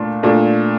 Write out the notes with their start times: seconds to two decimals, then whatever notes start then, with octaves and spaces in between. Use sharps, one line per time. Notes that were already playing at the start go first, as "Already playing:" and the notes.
Already playing: A#2 A3 D4
0.23 A#2 A3 D4